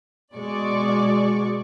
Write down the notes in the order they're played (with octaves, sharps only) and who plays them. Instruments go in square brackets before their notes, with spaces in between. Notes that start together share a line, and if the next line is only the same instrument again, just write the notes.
[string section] B2 G#3 D5 C#6